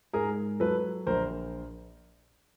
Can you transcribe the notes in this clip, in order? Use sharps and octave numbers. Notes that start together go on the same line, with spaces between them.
G#2 G#4 A#4
F#3 A4 B4
A#1 A#4 C5